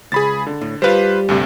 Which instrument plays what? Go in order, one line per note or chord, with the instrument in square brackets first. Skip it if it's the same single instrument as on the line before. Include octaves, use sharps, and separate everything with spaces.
[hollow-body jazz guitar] C#2 [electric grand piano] G#4 B5 A6
[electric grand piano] D3
[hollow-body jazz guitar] A2
[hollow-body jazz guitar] G3 F5 [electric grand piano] F4 B4 C5
[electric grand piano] D2 G2 C3